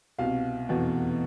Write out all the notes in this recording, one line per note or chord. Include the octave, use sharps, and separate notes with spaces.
C2 B2 F5
F1 E2 B2